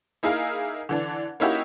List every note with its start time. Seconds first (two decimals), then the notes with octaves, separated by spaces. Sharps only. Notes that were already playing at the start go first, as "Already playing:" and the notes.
0.23 A#3 D#4 E4 G#4 A#4 F5
0.89 D3 E3 D4
1.40 A#3 C#4 D#4 E4 F#4 G4